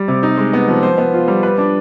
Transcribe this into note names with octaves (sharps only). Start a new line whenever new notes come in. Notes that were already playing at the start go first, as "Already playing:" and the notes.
Already playing: G3
C3
D#4
G#3
B3
F3
C5
B3
F4
G3
B4
D4